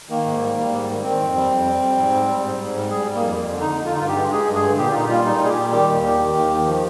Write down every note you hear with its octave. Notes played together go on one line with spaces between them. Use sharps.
D#3 A#3
G#2
G3
G3
G#2
D#3
D#3 C4
F2
G3
F2
G3
G3
G#2
G3
G3
G#2
G#2
G3
G3 G#4
G3
A#3
F2
F2
D3
D#4
D3
D3 F4
D#4
G2 F4
G4
G#3
G#3 G#4
G2
G#4
D3
A#2 G4
F4
A#2 D#4
G3 F4
G3 D#4
A#2 G#4
G4
G3
D#3 G4
D#2
D#3
D#3
D#2
D#3
F3